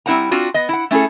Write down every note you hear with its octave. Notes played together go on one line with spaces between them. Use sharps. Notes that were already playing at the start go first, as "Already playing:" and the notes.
G3 C4 E4 C5 F#5 A#5
C4 D4 F4 F#4
B3 D#5
E4 F#5
A3 C#4 E4 G#4 A4